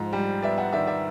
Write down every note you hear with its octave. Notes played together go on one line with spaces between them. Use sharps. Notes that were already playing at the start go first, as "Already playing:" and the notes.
Already playing: G#2 F3
G3
B3 D5 E5
E5 F#5
D#3 D5 E5
D5 E5